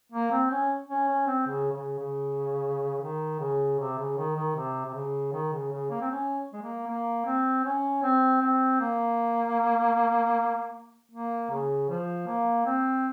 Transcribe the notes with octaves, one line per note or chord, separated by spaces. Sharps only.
A#3
C4
C#4
C#4
C#4
C4
C#3
C#3
C#3
D#3
C#3
C3
C#3
D#3
D#3
C3
C3
C#3
D#3
C#3
C#3
A#3
C4
C#4
G#3
A#3
A#3
C4
C#4
C4
C4
A#3
A#3
C#3
F3
A#3
C4